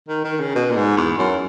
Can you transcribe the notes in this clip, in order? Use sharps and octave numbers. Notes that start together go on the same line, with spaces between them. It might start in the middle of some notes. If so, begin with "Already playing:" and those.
D#3
D#3
C#3
B2
A#2
G#2
E2
F#2